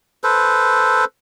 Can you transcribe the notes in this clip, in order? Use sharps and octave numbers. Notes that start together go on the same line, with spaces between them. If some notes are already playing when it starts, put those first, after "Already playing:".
A4 B4 C5